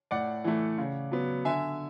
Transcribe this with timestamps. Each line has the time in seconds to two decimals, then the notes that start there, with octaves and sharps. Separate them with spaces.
0.11 A2 D5 F#5
0.44 E3 A3
0.78 C#3
1.12 F#3 B3
1.45 D3 E5 G#5